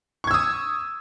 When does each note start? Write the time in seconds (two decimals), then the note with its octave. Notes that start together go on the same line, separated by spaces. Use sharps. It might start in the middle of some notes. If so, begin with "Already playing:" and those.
0.24 C#6
0.27 G#6
0.31 E6
0.34 D#6